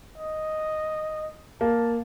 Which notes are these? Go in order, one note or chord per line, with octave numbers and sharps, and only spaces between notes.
D#5
A#3 A5